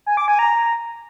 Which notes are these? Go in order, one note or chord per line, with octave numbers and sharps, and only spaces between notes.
G#5
D6
G#5
A#5